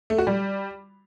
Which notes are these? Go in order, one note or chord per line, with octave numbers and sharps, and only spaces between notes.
A3
F#4
G3